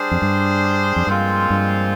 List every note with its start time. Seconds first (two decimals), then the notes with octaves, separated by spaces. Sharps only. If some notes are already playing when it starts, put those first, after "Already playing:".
Already playing: G3 D4 G#4 C5
0.11 F2
0.22 G2
0.96 F2
1.07 G2 A#2 F3 G#3 C4 F4
1.50 G2